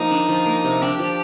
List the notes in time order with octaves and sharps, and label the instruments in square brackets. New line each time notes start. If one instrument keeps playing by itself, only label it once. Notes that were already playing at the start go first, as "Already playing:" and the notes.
Already playing: [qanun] F3 A#3 [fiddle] D#4
[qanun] D4
F3
A#3
C3
[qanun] D4 [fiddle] G4
[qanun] F3